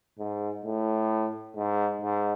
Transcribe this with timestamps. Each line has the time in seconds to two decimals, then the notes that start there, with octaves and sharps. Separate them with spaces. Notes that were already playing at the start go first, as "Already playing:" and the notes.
0.19 G#2
0.65 A2
1.56 G#2
2.02 G#2